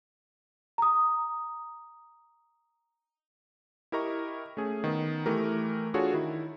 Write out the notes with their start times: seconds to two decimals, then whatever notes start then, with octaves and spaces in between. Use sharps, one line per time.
0.78 A#5 D#6
3.92 E4 G4 A#4 D#5 A#5 C#6
4.57 A3 C#4 G#4
4.84 D#3 B3
5.26 E3 A3 E4 G4 A#4
5.94 D4 F4 F#4 G#4 A4 C#5
6.13 D#3 E4